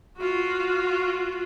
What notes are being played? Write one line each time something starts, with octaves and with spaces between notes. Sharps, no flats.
F4 F#4